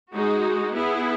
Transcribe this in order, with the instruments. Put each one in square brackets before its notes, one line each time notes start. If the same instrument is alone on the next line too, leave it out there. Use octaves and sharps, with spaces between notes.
[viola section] G#3 D#4 F#4
B3 E4 G#4